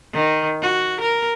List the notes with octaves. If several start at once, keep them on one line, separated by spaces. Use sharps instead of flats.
D#3
F#4
A#4